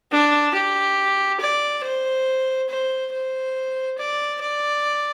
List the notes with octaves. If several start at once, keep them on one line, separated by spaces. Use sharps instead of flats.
D4
G4
D5
C5
C5
C5
D5
D5